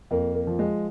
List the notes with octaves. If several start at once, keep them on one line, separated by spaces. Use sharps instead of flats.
F2 A#3
A#3
F3
G#3